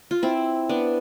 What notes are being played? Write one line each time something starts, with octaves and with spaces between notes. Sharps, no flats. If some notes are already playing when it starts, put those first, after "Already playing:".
F4
C4 E4
B3 D4